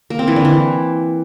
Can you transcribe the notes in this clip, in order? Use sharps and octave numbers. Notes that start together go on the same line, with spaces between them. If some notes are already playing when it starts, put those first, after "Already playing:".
A#3
C4
E3
D3
E3